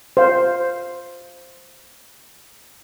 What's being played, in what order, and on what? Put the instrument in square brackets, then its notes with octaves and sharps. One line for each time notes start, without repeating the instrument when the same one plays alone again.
[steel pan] C5 F5